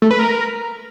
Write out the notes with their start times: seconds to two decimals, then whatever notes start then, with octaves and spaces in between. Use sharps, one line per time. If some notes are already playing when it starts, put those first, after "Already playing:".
0.02 A3
0.11 B4
0.19 A#4